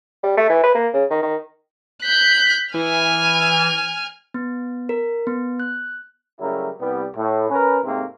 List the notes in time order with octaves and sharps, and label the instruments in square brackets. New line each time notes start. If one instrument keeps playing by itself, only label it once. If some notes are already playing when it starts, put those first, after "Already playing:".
[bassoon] G3
A3
E3
B4
A#3
C#3
D#3
D#3
[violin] F#6 G6 [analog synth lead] B6
[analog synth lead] E3 [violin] G#5 F6
[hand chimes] B3
A#4
B3
F#6
[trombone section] C#3 F#3 G3 A3 E4 A#4
C2 G3 B3
A2
C#4 A#4 B4
G#2 C3 A3 A#3 C4